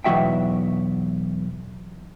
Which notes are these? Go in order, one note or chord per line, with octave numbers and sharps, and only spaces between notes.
B1 E2 F3 F#4 E5 G5